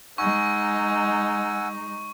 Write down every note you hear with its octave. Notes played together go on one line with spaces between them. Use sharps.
G#3 D#4 F#5 G#5 C#6 E6